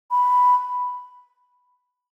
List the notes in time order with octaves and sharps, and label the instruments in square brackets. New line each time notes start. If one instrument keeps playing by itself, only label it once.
[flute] B5